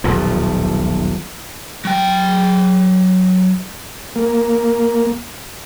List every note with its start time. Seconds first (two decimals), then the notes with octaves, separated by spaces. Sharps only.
0.04 D#1 B1 E2 F3
1.85 F#3 G5
4.16 A#3